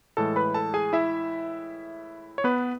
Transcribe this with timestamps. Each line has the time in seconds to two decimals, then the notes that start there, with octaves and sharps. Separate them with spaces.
0.17 A2 E3 G#3 A4 A5
0.36 B4 B5
0.54 A4 A5
0.74 G#4 G#5
0.93 E4 E5
2.38 C#5
2.44 B3 B4